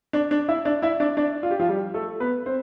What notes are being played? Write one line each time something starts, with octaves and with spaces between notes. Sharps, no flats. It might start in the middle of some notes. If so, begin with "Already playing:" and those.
D4 D5
D4 D5
E4 E5
D4 D5
E4 E5
D4 D5
D4 D5
F4
G4
F3 F4
G3 G4
A3 A4
B3 B4
C4 C5